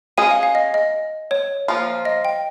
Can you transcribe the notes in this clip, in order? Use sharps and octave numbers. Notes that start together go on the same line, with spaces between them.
G#3 C#4 G#4 G#5
F5
F5
D#5
D#5
C#5
F3 A#3 F4
D#5
G5